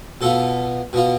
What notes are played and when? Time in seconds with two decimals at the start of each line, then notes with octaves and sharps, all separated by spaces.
0.21 B2 B3 F4 A4
0.93 B2 B3 F4